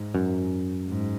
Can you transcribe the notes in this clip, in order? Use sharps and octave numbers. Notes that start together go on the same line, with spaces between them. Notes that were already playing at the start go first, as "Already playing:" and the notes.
Already playing: G#2
F#2
G#2